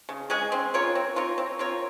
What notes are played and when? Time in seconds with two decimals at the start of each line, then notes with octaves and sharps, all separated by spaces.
0.09 C#3
0.30 G#3 C#4 G#4
0.52 C4
0.74 F4 A#4 C#5
0.95 C4
1.16 F4 A#4 C#5
1.38 C4
1.59 F4 A#4 C#5